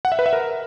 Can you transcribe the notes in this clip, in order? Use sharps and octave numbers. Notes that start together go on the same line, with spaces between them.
F#5
E5
B4
E5
A#4